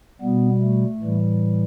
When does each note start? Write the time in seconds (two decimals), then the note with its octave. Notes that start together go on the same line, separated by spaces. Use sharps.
0.21 B2 G3 B3
0.61 A3
1.00 A2 E3 G3